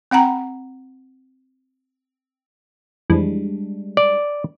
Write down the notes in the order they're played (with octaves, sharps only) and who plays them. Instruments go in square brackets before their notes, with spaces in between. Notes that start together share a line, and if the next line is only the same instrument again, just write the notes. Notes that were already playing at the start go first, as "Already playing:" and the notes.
[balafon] C4 F#5 G5 A#5 B5
[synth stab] F2 E3 [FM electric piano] G3 G#3 D4
[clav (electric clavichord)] D5